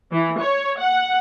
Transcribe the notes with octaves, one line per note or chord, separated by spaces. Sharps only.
E3
C#5
F#5